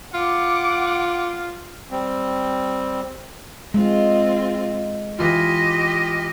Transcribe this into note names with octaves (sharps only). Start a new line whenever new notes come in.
F4 F#5 D6
G3 C4
G#3 C4 F4
E3 F4 G4 D#5